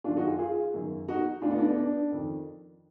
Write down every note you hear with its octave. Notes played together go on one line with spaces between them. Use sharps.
F#2 D#3 D4 F4
D#4 F#4
F4 G#4
F4 G#4
F#2 D#3
D#4 F#4
D2 D3 D4 F4
B3 D#4
D4
B3 D#4
D4
F2 D#3